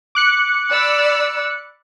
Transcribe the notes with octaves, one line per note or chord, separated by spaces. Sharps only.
D6 F#6 C#7
D5 B5 E6